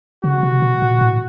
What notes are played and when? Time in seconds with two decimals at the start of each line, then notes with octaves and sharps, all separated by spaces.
0.24 C#3 F#4
0.43 C3
0.62 B2
0.82 A#2
1.01 A2